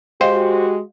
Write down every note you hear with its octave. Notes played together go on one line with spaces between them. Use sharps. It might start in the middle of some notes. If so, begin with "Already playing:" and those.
G#3 F#4 G4 C5 D#5 F5 G5